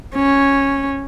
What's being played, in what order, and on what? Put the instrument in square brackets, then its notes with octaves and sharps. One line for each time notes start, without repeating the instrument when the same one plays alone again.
[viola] C#4